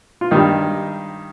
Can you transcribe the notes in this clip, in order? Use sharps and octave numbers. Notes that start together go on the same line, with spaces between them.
F4
G2 D#3 G3 D#4